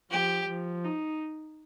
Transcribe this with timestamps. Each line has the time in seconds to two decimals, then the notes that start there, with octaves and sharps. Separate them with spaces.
0.11 F3 G4
0.48 F3
0.85 D#4